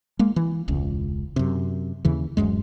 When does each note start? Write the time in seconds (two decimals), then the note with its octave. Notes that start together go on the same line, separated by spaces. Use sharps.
0.19 G#3 A#3
0.36 E3
0.68 E1 C#2
1.36 F#2 C3
2.05 D#2 C#3 E3
2.37 D1 A#1 F#2 G#3